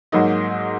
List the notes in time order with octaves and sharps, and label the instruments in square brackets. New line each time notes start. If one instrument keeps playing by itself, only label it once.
[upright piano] G#2 F#3 A#3 D#4